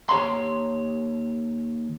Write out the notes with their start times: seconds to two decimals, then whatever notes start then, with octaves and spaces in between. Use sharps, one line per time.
0.09 D#2 G4 C#5 A#5 C6